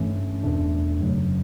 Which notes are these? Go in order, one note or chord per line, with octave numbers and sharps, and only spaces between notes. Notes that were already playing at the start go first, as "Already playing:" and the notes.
Already playing: G2 E3 A3 C#4
E2 B2 A3 D4
F#2 C#3 F#3